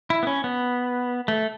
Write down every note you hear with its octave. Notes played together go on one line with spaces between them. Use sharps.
E4
B3
C#4
B3
A3